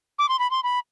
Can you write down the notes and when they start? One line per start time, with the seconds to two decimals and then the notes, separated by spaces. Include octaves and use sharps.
0.19 D6
0.29 C6
0.39 B5
0.51 C6
0.64 B5